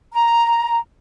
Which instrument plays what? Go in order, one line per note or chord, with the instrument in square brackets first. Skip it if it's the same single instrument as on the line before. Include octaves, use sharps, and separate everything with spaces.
[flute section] A#5